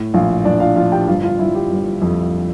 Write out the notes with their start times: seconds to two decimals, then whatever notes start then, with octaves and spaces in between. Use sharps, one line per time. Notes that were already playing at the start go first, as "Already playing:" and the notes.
Already playing: A2
0.14 A#1 F4 F5
0.45 A#1 D4 D5
0.60 F4 F5
0.76 F3 F4 F5
0.92 G4 G5
1.08 G1 F4 F5
1.23 F4 F5
1.39 G1 E4 E5
1.54 G4
1.70 G1
2.02 F2